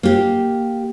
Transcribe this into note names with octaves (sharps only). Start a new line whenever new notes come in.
A#3 G4